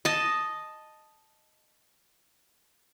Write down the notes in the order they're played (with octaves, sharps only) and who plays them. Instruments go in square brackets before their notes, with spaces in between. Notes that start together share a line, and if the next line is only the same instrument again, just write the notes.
[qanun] D#5 A5